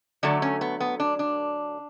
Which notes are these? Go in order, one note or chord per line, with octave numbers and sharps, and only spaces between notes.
D3 F#3 A3 D4
C#4
B3
B3
D4
D4